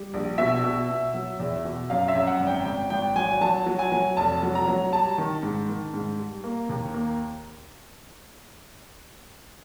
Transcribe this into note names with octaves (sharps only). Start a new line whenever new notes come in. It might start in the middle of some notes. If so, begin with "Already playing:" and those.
Already playing: G3
A#1
B2 E5
B2
B2
F#3
E2
B2
F#2 F5
E5
F#2
F#5
G#1
G5
G#1 G5
G#1 G5
F#3 G#5
F#3 A5
F#3
G#5
F#3
F1 A5
F#3
A#5
F#3
G3 A5
D#3
G#2
D#3
G#2
G3
A#3
D#2
A#3